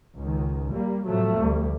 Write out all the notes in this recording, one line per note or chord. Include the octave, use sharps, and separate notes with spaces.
C#2 D#3
G3 A#3
A2 C3 F3 F#3 A3
D2 G3